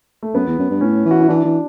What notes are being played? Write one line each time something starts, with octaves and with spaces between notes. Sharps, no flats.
A3
F#2 B3
E2
F#2
G2
A2 C#4
E3
F#4
E4
E3 D4
E3